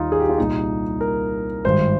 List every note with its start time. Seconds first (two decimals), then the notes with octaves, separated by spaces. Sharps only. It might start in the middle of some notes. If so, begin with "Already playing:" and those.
Already playing: D#2 D#3 G3 D#4 F4
0.12 G#4
0.20 G4
0.29 F4
0.38 C2 A#2 G3 D#4
1.01 A#4
1.65 G#1 G2 D#3 C5